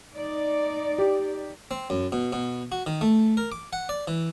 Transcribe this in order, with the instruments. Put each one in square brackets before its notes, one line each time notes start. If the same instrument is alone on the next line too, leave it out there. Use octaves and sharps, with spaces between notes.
[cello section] D#4 D5
[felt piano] G4
[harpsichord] C4
F#2
B2
B2
F#4
D#3
A3
A#4
D6
F#5
D5
E3